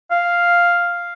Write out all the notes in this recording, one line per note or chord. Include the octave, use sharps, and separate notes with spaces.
F5